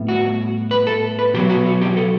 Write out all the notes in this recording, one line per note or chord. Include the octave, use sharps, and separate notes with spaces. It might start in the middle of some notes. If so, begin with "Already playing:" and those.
Already playing: A2 G3 B3
F#4
B4
A4
B4
B2 F#3 B3 G4
F#4
F#4
G4
A4